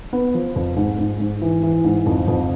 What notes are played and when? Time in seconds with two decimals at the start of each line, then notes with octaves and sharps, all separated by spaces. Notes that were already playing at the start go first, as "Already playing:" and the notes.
0.13 B3
0.34 F3
0.56 F2
0.77 G#2
0.99 G#2
1.20 G#2
1.42 E3
1.63 E3
1.84 G#2
2.06 F2
2.28 F2